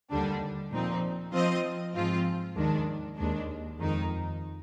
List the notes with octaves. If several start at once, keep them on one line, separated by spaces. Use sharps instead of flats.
D#2 D3 G3 D4
A#2 F3 C4 D#4
F3 C4 F4 C5 D#5
G#2 F3 C4 F4
D#2 D#3 G#3 D4
D#2 D#3 G#3 D4
F2 D#3 G#3 D#4